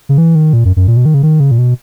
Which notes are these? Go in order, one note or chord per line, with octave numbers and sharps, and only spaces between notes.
C#3
E3
D#3
A#2
F#2
F#2
A#2
B2
D#3
C#3
D#3
C#3
A#2
B2